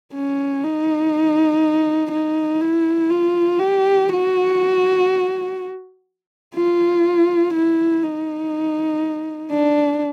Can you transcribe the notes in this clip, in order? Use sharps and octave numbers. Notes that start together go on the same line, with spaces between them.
C#4
D#4
D#4
E4
F4
G4
F#4
F4
E4
D#4
D4